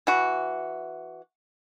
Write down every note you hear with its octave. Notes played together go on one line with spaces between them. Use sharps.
E3 F#4